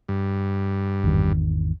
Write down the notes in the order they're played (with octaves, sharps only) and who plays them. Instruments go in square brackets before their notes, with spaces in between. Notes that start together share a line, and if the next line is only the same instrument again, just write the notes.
[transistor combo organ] G2
[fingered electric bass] G#1 E2 D#3